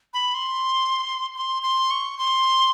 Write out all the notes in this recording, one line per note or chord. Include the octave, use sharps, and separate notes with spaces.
B5
C6
C6
C6
C#6
C6